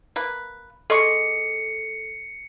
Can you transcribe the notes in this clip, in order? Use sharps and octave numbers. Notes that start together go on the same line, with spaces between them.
A#3 B4
G#3 A4 D#5 C#6 C7 C#7